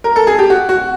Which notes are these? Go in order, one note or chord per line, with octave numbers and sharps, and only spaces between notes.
A#4
A4
G#4
G4
F#4
F#4